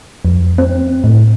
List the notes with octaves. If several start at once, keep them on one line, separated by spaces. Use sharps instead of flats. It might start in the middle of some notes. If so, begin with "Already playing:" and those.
F2
C4
A2